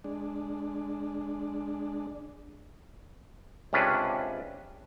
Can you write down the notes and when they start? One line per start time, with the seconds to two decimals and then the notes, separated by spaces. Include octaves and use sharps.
0.04 G#3 D4
3.73 C#2 C3 C#4 D4 B4